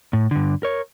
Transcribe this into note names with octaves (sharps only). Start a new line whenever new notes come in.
A2
G2 D3
A#4 C#5